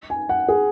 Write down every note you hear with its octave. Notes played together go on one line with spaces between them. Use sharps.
G#5
F#5
G#4